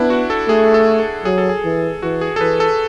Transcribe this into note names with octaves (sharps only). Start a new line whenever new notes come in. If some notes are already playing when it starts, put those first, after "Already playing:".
Already playing: B3 D4 E4
F#4
A4
A3 G#4
A4
A4
F#3 G#4
A4
G#4
E3
E3 F#4
G#4
A4
E3 B4
A4